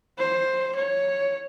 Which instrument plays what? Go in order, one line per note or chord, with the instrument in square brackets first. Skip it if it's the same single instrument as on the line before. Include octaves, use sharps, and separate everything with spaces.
[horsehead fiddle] C5
C#5